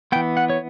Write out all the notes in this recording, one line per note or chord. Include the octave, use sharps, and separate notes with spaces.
E3 B3 G5
F#5
C#5